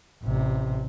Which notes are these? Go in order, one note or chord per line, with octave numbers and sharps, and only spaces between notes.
A1 C3